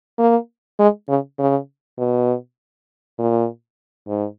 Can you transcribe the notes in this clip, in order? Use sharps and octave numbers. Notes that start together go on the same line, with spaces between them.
A#3
G#3
C#3
C#3
B2
A#2
G#2